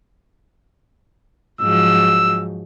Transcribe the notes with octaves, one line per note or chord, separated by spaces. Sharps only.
G#2 F3 F#3 E6